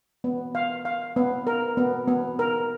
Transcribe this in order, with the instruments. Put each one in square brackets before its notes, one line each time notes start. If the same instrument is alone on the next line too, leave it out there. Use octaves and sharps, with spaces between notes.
[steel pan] B3
F5
F5
B3
A#4
B3
B3
A#4